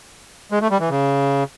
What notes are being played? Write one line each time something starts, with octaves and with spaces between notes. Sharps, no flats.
G#3
A3
G3
E3
C#3